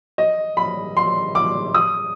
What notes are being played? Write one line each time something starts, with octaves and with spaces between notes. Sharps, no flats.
D#5
B5
C6
D6
D#6